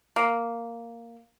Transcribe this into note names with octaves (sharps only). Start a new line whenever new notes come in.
A#3